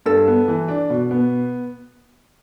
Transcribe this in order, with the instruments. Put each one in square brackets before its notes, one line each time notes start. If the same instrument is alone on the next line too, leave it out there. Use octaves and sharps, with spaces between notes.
[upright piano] G2 [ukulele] A4
[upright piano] B3
E3
D4
B2
B3